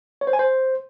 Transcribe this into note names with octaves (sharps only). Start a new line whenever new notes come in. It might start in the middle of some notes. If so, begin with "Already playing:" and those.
C#5
C5
G#5
C5